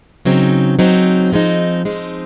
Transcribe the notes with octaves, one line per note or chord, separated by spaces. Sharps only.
C#3 F#3 C4 D#4
C#3 F#3 C4 D#4
F3 G#3 C4 D#4
F3 G#3 C4 D#4